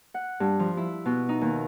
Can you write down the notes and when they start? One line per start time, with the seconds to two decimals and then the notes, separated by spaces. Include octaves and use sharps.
0.14 F#5
0.40 G2
0.59 F3
0.77 E4
1.06 B2
1.29 D#4
1.41 D#2